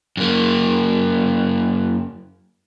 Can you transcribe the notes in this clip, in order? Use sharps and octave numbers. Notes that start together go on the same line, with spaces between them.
F#2 A#3